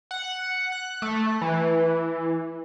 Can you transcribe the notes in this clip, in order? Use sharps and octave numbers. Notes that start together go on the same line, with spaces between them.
F#5
F#6
A3
E3